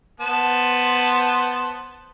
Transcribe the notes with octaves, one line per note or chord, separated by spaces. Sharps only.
B3 C5 A5